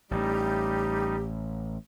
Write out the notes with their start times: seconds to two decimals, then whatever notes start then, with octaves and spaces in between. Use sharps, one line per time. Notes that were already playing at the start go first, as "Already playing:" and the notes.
0.11 A1 A2 G3 D#4 G4